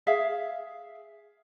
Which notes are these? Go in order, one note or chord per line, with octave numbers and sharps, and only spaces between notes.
G#4 E5 F5